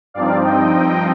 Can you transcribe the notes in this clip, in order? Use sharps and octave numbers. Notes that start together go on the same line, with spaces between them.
G2 F3 C4 D#4 D5 F5
D#5 G5